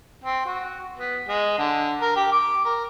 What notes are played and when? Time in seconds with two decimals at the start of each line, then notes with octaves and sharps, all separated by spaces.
0.24 C4
0.46 F#4
0.98 B3
1.28 G#3
1.58 D3
2.01 A#4
2.16 G4
2.32 D6
2.65 A#4